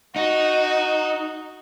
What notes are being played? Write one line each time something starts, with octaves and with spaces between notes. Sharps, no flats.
D#4 F#4